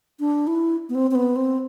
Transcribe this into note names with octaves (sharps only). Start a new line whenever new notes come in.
D4
E4
B3
C4
C4
B3
C4